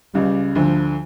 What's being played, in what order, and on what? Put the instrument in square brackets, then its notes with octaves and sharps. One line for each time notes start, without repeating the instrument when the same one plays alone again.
[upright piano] C#2 C#3 [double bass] G3
[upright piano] D2 D3 [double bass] F3